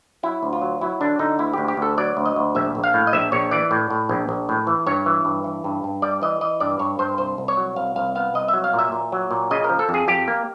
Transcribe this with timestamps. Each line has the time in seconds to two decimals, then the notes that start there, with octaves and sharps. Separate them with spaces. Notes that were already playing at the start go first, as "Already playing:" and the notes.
0.23 F#3 E4
0.43 D2
0.53 F4
0.62 F#3
0.81 F#3 E4
1.01 D3 D4
1.19 D3 D#4
1.39 D2 E4
1.54 D2 G4
1.68 G4
1.77 D2 A4
1.98 F#3 D5
2.17 D2
2.26 D#5
2.36 D2
2.55 A#1 E5
2.75 A#1
2.84 F5
2.94 A2
3.07 D#5
3.13 A#1 E5
3.32 A#1 C#5
3.51 E3 D5
3.71 A2
3.90 A2
4.09 A#1
4.29 A#1
4.49 A2
4.67 E3
4.86 G2 C#5
5.06 E3
5.25 G2
5.44 E3
5.64 G2
5.84 G2
6.02 G3 D5
6.22 E3 D#5
6.41 E3 D#5
6.60 G2 D5
6.79 G2 C#5
6.99 G2 C5
7.18 C2 C5
7.38 C2
7.48 C#5
7.57 F#3
7.76 C2 F5
7.96 C2 F5
8.15 B3 F5
8.34 C2 D#5
8.48 E5
8.54 F#3
8.64 F5
8.73 A#2
8.79 E5
8.92 A#2
9.12 F#3
9.31 A#2
9.51 C#3 D#5
9.64 A#4
9.69 F3
9.79 A4
9.89 F2
9.94 G#4
10.08 F2 G4
10.28 A#3